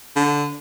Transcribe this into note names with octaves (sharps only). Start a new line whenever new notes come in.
D3